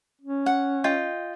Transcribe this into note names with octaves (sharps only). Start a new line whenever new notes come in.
C#4
F#5
F4 D#5 G5